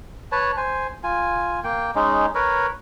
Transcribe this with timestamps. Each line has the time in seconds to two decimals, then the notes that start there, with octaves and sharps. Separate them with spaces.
0.32 B4 C#5 A5
0.57 C5 G#5
1.04 F4 G#5
1.64 A#3 G5
1.95 G#3 C#4 D#4
2.35 A#4 B4 C#5